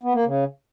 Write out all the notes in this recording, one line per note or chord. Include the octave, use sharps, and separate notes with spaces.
B3
A#3
C#3